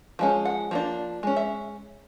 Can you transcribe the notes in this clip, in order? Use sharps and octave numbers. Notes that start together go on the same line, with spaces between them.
F3 G#3 C#4
F#5
F3 A#3 D4
G#3 C#4
E5